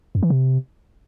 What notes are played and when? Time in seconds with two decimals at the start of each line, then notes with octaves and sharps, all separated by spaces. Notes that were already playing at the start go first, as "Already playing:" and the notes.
0.15 F#2
0.23 E3
0.30 C3